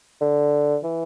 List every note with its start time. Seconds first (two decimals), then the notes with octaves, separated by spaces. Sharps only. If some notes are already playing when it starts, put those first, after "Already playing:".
0.21 D3
0.84 E3